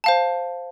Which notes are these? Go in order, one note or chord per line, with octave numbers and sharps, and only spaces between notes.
C5 F5 A5